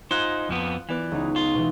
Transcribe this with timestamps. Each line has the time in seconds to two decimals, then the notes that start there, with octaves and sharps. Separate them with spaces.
0.11 D#4 F4 C5 F#6 G#6
0.49 F2 F3 B3
0.89 E3 B3 D5 F#6
1.12 C#2 D#4
1.36 F4
1.54 B2 E3